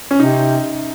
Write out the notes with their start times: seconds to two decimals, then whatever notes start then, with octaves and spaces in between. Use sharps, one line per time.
0.11 C#4
0.19 C3 D#4